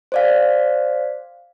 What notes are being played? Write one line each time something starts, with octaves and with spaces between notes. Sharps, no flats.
C5 D5 F5